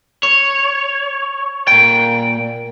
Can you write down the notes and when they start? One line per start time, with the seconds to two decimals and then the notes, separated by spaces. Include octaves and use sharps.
0.23 C#5
1.68 A#2 G5